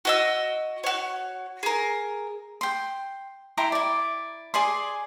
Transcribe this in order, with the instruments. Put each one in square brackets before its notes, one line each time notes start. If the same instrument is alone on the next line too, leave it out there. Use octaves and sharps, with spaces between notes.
[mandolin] F#4 D#5 E6
F#4 C#5
G#4 A#4
[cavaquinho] G5 C6
E4 G5 A#5 C6
E4 D5
G#4 D5 G#5 C6